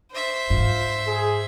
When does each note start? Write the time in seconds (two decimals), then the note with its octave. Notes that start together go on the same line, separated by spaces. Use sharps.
0.11 C5 E5
0.50 G#2 F4
1.07 G#4